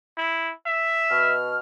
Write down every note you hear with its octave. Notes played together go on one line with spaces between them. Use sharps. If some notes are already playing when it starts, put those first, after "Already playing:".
E4
E5
B2 F6